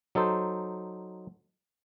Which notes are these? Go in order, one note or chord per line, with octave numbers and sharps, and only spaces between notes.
F#3 D#4 A4 C5